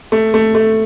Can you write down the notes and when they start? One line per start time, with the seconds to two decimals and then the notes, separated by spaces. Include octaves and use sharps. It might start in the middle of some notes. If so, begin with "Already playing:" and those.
0.12 A3
0.34 A3
0.55 A3